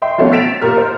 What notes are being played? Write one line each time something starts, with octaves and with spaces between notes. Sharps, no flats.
D#5 E5 G5 C6
F3 F#3 A3 B3 C#4
E6 A6 B6 D7 E7 F7
A#2 G4 A#4 F6
C5